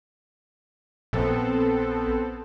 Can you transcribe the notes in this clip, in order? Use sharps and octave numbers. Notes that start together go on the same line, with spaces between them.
A#1 B3 C4 A4